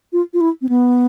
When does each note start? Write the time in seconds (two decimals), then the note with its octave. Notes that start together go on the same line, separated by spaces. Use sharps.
0.13 F4
0.34 F4
0.41 E4
0.62 C4
0.69 B3